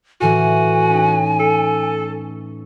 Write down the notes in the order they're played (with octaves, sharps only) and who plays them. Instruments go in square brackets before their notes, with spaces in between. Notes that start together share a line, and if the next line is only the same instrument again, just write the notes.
[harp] A2 E3 [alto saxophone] F#4 [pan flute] G#5
[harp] C#4 D#4
[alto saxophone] A4